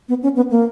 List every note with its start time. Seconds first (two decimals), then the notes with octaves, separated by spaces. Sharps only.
0.09 B3
0.23 C#4
0.36 B3
0.51 A#3